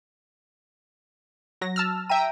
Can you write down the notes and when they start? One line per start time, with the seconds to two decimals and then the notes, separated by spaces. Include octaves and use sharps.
1.61 F#3 A#6
1.76 A5 E6 F6
2.10 E5 G5 A#5 D#7